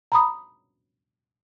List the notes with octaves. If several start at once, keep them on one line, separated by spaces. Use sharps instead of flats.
A#5 B5 D#6